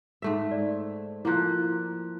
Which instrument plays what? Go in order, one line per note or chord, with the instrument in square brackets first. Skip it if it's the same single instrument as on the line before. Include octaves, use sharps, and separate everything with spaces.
[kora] G#2 A3 E5
[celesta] D5
[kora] F3 A#3 [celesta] E4 F#6